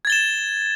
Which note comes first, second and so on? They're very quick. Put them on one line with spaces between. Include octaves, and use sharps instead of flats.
G#6 A6 G7 E7